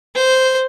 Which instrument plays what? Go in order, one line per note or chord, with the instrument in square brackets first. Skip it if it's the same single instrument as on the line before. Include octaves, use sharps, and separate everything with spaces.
[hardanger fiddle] C5